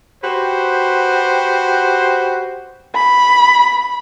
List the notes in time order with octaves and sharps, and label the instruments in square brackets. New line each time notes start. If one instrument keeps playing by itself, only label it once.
[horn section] F#4 G4 B4 C5
[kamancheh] B5